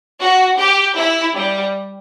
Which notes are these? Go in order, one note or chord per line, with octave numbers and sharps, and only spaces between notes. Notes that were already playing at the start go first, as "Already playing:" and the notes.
F#4
G4
E4
G3